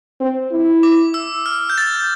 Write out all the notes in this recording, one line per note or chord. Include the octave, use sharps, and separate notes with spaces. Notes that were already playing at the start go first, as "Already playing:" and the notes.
C4
E4
D6
E6
F6
G6
A6